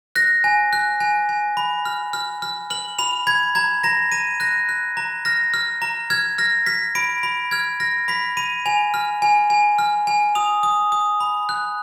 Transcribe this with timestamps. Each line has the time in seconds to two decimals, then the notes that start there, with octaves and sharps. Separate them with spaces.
0.15 F#6 A#6
0.44 G#5
0.73 F#6
1.00 G#5
1.29 G#5
1.57 B5
1.85 F6
2.13 F6
2.42 F6
2.70 F6 F#7
2.99 B5 F7
3.27 B5 G#6
3.55 A#5 G#6
3.83 A#5 A#6
4.12 A#5 D#7
4.40 F#6 A#6
4.69 F#6
4.97 A#5
5.25 F6 A#6
5.54 F6
5.82 A#5
6.10 F6 G#6
6.38 F6 A#6
6.66 F6 B6
6.95 B5 D7
7.23 B5
7.51 F6 G#6
7.80 F6 A#6
8.08 B5 B6
8.37 B5 D#7
8.66 G#5 F7
8.94 F6
9.22 G#5
9.50 G#5
9.79 F6
10.07 G#5
10.35 D#6 F7
10.63 D#6
10.92 D#6
11.20 B5
11.49 F#6